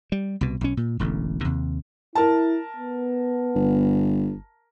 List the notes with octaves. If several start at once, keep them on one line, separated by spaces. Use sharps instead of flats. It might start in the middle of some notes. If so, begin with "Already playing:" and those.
G3
C2 B2
B1 C#4
A#2
E1 A1 D3
D#2 C3
E4 A#4 A5
B3
G1